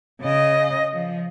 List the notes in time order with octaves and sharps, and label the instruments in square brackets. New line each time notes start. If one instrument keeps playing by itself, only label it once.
[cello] C#3 D#5
F3